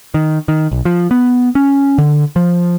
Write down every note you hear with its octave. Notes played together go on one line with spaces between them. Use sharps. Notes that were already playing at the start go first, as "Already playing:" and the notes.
D#3
D#3
B1
F3
B3
C#4
D3
F3